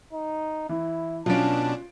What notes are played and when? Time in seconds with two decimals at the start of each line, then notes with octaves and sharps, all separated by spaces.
0.13 D#4
0.69 E3 E4
1.26 B2 F#3 C#4 D4 F4 A5 D7